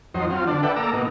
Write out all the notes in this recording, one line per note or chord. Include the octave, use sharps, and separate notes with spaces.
F2 F#3 D#4 C5
F#3 C4 F4
D3 D4
A4 B4 D5 E5 F#5 G5
A#3 A4 A#5 D6 E6
B2 A#3 D#4